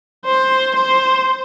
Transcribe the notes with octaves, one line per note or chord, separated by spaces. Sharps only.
C5
C5